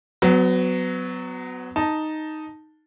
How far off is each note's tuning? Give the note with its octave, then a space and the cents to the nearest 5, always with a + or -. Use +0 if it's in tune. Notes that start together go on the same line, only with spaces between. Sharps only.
F#3 +0 B3 +30
D#4 +0 A5 +5